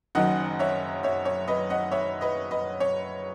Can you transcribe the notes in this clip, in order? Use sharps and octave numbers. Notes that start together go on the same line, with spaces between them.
F#1 F#2 D#3 D#5 F#5
C#5 E5
C#5 E5
C#5
B4 D#5
D#5 F#5
C#5 E5
B4 D#5
B4 D#5
C#5